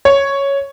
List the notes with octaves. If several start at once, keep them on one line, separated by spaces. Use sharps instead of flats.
C#5